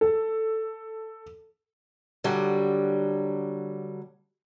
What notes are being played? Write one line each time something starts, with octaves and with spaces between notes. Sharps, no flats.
A4
D3 F#3 G3